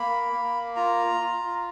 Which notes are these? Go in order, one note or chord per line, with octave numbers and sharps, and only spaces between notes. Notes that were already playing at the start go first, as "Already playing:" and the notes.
Already playing: A#3 B5
A#3
F4 A#5
F4